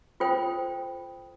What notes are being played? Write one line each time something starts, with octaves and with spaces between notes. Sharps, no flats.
F4 A4 C5 G5